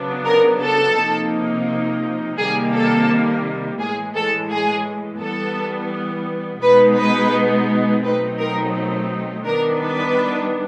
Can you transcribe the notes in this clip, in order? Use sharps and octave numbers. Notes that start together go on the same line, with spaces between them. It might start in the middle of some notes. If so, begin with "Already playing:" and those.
Already playing: C#3 F#3 B3 D4
A#4
A4
C3 F3 A#3 D#4
C3 D#3 G3 A#3 G#4
A4
A2 E3 G#3 G#4
A4
G#4
E3 G3 B3 A4
B2 G#3 B3 D#4 B4
B4
B2 F#3 A3 C4 D#4 B4
A#4
D#3 G3 B3 D4 A#4
B4